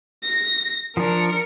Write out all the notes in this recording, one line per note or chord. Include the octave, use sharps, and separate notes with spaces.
A#6
F3 D4 A#4 C#7